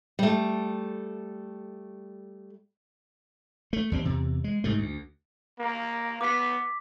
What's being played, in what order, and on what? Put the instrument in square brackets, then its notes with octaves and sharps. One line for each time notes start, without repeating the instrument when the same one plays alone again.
[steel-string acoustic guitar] G3 A3
[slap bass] A3
D#2 G3 C4
E2 C3
G#3
G#2 C3 A3
D2
[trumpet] A#3
[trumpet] B3 [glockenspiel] D6 B6